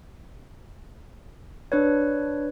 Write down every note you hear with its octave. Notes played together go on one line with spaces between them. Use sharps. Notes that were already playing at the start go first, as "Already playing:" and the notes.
D4 B4 C#5